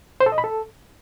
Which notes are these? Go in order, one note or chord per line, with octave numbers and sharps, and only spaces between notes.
C5
A4
D#5
B5
A4